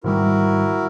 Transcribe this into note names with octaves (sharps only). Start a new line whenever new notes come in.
G#2 D#3 G3 E4 F#4 A#4